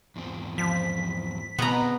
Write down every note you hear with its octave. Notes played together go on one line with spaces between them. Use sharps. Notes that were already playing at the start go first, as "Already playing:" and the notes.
E2 G#2 C4
F3 B6
B2 B3 C4 F#4 G#4 A#5